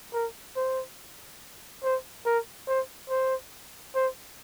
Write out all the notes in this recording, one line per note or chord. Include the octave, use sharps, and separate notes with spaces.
A#4
C5
C5
A#4
C5
C5
C5